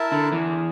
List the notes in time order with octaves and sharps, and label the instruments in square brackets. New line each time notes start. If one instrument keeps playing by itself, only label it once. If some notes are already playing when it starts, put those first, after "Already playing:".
Already playing: [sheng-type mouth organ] E4 A#4 E5 A5
[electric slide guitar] D3
E2 E3